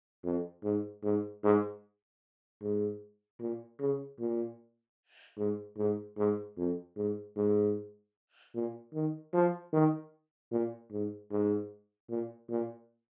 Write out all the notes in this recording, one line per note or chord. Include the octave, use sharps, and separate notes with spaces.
F2
G#2
G#2
G#2
G#2
A#2
C#3
A#2
G#2
G#2
G#2
F2
G#2
G#2
A#2
D#3
F3
D#3
A#2
G#2
G#2
A#2
A#2